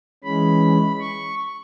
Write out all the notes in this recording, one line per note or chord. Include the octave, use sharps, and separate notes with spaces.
E3 G#3 C#4 B5
C#6